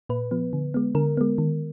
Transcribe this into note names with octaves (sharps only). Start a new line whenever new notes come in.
A#2 B4
F3 B3
D3
G#3 B3
D3 A#4
G#3 B3
D#3